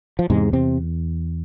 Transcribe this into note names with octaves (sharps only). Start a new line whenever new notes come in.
F3
E2 G#2 C3 G#3
C3 C4